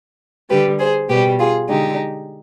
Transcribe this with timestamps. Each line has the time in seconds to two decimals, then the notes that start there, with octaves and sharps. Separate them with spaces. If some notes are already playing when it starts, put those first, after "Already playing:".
0.50 D3 G3 G4 B4
0.79 G#4 C5
1.09 B2 G4 B4
1.14 G3
1.39 F4 G#4
1.69 D3 G#3 D#4 G4